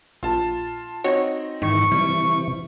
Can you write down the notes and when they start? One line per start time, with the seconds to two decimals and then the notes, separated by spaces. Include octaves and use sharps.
0.23 A#1 F4 A5
1.04 C4 D#4 F#4 C#5
1.62 G#2 D#3 E3 C#6
1.92 C3 E3 G3